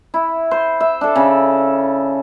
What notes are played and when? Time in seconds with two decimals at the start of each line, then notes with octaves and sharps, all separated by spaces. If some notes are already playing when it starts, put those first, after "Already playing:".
0.14 E4
0.51 C5
0.80 E5
1.01 D4 A4
1.16 C#3